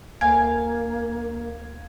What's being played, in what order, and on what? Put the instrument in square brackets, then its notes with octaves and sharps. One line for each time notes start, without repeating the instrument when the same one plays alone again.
[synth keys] D2 F5 G#6 [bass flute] A#3 [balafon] G#5